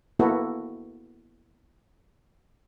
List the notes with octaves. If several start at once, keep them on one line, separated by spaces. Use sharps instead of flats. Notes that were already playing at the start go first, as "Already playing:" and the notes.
A#3 B3 E4 F#4 A4